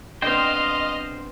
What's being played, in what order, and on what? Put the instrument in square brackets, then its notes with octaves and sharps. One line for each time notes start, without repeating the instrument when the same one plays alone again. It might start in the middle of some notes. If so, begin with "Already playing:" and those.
[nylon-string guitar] B3 C4 D4 [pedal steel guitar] C5 G5 [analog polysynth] D#5 [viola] F5 C6